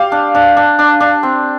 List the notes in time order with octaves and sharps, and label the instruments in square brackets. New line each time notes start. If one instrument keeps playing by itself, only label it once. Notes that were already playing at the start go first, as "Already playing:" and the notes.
Already playing: [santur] G4 D5 [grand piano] F5
[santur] D4
D4
D4
D4
D4
C4